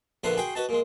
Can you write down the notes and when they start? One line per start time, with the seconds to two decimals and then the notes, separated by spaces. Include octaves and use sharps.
0.24 A#1 D3 B3 E5 F#5 C6
0.37 F#4 G#4 G5 B5 C6
0.55 F#4 B4 D#5 A5
0.69 A#2 G#3